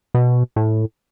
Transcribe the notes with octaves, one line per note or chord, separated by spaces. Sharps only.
B2
A2